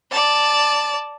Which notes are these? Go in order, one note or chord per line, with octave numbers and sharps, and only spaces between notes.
D5 A5